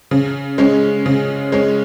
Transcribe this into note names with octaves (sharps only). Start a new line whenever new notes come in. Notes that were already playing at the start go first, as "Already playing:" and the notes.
C#3
G#3 C#4
C#3
G#3 C#4